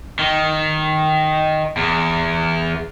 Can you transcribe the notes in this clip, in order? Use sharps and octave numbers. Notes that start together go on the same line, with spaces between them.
D#3
E2